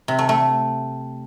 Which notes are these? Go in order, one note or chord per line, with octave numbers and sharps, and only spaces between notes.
C3
A3
A3